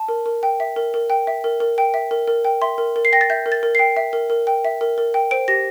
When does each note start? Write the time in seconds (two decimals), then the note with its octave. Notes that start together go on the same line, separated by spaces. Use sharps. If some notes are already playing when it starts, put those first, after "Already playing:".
Already playing: A5
0.09 A#4
0.26 A#4
0.43 G5
0.60 E5
0.76 A#4
0.94 A#4
1.10 G5
1.27 E5
1.44 A#4
1.60 A#4
1.78 G5
1.94 E5
2.11 A#4
2.27 A#4
2.45 G5
2.62 E5 C6
2.78 A#4
2.96 A#4
3.05 C7
3.12 G5 A#6
3.21 A6
3.30 E5 G6
3.46 A#4
3.52 A6
3.63 A#4
3.75 G5 C7
3.97 E5
4.13 A#4
4.30 A#4
4.47 G5
4.65 E5
4.81 A#4
4.98 A#4
5.14 G5
5.31 C5 D7
5.48 G4 A#6